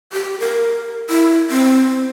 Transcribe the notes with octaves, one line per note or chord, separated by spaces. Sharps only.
G4
A#4
E4
C4